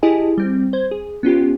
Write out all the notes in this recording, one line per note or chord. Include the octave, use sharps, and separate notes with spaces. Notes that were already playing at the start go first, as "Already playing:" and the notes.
E4 G4 G#4 D#5 G#5 A5
G3 C4
C5 G#6
G#4
B3 C#4 F4 G4